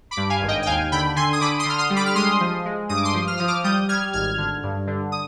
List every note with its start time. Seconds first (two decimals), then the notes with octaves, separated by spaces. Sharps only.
0.11 B5 D6
0.17 G2
0.30 F5 G#5
0.41 G#1
0.48 D#5 G5
0.62 G5
0.66 D#2 F5 G#5
0.92 D3 G5 B5
1.16 D3 G#5 C6
1.33 D#6
1.41 D3 B5 D6
1.59 C6 D#6
1.65 D3 F6
1.78 C6 D#6
1.90 G3
1.96 B5 D6
2.06 F6
2.15 G#3 C6 D#6
2.40 F3
2.65 G#3
2.89 G2 D#6
2.97 D6
3.05 C6 D#6
3.14 F3
3.27 F6
3.37 F3 D#6
3.48 D6 F6
3.64 G3 D#6 G6
3.89 G3 F6 G#6
4.13 G#1 F6 G#6
4.38 D3
4.63 G2
4.87 D3
5.12 D#6